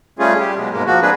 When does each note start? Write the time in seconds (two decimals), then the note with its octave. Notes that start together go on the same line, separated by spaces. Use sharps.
0.19 G3 A3 C#4 F4 G#4
0.39 G3 G4
0.57 B2 F#3 G#3
0.72 G#2 B2 G#3 A#3
0.86 F3 A#3 F#4
1.02 G#3 C4 D4 G#4 B4